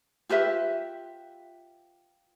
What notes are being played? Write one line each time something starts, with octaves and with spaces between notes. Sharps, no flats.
F4 G4 B4 E5